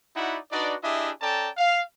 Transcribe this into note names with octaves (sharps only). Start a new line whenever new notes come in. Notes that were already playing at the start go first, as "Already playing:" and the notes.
D#4 E4 F#4 D5 F#5 B5
D4 D#4 F#4 B4 D5
D4 E4 G4 G#4 D#5 E5
C#4 A4 D5 G5 A5 A#5
F5